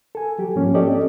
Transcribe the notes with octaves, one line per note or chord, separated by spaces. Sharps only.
A4 G#5
F#3 G4
G#2 F3 A#3 C#4
C4 C#4 G4 A4 D5 D#5